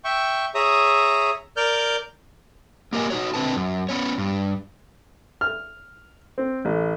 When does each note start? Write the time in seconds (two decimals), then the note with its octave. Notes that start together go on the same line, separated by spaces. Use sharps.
0.04 E5 G5 C#6
0.55 G#4 C#5 E5 A#5 D#6
1.57 A#4 D5 F6 G6
2.93 A#3 G4 A#4 D#5 G#5
3.10 D#4 F#4 C#5
3.34 D3 C4 B4 A5
3.56 F#2
3.89 B3 C#4 C#5
4.18 G2
5.41 F6
6.38 C4
6.65 A1